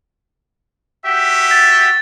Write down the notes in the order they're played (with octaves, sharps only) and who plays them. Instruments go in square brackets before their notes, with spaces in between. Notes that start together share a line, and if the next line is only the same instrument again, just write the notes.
[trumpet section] F#4 G4 E5
[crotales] A6